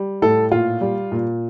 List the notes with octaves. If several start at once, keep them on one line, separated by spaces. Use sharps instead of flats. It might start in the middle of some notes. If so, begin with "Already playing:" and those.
Already playing: G3
A2 A4
A#2 F4
G3
A#2